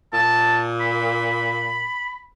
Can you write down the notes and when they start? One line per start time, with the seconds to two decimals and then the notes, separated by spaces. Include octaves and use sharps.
0.13 A#2 A5
0.81 B5